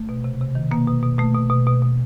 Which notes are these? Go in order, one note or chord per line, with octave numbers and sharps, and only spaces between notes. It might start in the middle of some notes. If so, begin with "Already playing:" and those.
Already playing: A3
B2
C3
C3
D#3
B2 A#3
B2
B2
B2 A3
B2
B2
B2
B2